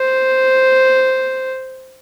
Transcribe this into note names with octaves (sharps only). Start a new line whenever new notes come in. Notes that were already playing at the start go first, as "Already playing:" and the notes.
Already playing: C5